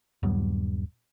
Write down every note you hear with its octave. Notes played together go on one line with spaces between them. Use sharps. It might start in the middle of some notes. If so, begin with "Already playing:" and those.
D#1 G2 F#3 B3